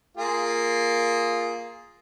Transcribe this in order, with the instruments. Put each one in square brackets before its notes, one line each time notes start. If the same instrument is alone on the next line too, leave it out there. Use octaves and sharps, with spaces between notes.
[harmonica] A#3 F4 G#4